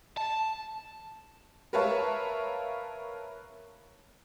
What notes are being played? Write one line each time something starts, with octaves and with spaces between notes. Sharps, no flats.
A5
A#4 B4 C#5 E5 F5 A5